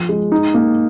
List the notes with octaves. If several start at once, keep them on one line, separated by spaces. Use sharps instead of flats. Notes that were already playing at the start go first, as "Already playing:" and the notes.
Already playing: F3
G#3
D#4
A#3